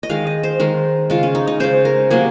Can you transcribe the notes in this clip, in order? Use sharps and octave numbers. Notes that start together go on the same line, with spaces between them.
D#5
D#3 G#3 F5
D#5
C5
D#3 G#3 A#4
C#3 G#3 F4
C#4
D#4
D#4
C#3 G#3 C5
A#4
C3 F#3 A#3 G#4